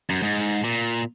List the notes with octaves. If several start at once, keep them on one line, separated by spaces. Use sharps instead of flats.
F#2
G#2
A#2